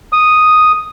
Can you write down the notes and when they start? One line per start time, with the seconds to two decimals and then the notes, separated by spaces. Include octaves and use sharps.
0.13 D#6